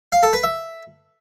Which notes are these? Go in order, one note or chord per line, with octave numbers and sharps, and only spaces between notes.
F5
A4
B4
E5